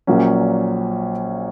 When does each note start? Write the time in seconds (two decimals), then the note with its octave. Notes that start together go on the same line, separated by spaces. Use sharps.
0.07 A#1 A#2 F#3 A#3 C#4